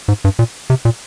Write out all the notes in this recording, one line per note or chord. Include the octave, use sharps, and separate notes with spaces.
G#2
G2
A#2
C3
A#2